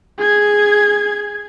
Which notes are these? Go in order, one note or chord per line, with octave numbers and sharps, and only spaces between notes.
G#4 G#6